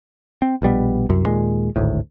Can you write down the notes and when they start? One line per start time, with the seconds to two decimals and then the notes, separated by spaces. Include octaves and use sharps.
0.42 C4
0.62 A#1 B2 G3 B3
1.09 C2 F#2
1.26 D#2 A#2 G#3
1.76 G#1 D2 A2